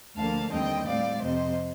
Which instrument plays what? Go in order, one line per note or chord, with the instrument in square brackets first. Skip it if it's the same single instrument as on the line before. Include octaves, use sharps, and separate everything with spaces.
[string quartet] D2 D3 F3 A#3 F5 A5
D#2 D3 G3 C4 D#5 G5
A2 G3 C4 D5 F5
F2 C3 F3 C5 D#5